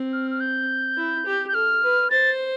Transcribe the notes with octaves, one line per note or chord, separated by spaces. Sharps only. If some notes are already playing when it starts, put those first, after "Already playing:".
Already playing: C4
F6
F6
G6
E4
G4
G6
A4 F6
B4
C5 A6